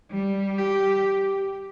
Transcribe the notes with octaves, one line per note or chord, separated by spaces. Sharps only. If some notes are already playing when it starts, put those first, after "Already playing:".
G3
G4